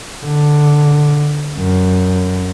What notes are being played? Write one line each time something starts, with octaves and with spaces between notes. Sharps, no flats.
D3
F#2